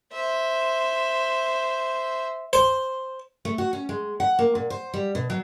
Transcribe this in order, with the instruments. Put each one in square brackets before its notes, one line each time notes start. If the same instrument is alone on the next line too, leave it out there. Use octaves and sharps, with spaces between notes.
[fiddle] C5 E5
[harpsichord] C5
[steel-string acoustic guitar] A3
F#4
C#4
G#3
F#5
A#3
A#2
C5
G3
B2
F#3